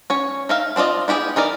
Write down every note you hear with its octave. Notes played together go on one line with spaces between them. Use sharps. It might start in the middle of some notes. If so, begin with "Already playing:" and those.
C#4 C#5
D#4 E5 F5
C4 D4 F4 D5 D#5
B3 E4 G4 G#4
E3 D#4 A#4 D5